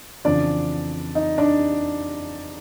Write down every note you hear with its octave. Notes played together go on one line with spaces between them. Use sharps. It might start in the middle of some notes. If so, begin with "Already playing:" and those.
F2 C#3 E3 D4 D5
D#4 D#5
D4 D5